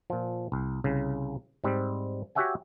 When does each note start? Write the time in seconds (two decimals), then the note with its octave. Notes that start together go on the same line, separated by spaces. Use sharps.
0.10 A#2 F3
0.52 C2
0.84 C2 C#3
1.64 G#2 G3 C4
2.35 F#4 G4 C#5 E5 F#5 G#5